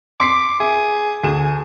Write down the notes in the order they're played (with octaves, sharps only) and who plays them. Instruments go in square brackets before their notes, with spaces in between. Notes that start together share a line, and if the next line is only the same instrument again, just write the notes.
[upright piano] C6 B6 C7 [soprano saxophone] D6
[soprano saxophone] G#4 [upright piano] E5
[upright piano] D2 E7 [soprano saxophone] G#4